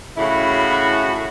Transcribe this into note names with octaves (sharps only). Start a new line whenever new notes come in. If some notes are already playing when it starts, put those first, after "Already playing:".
A2 C#3 E4 F#4